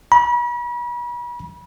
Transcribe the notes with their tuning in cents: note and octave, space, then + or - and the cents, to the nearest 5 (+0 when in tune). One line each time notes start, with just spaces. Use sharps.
B5 -40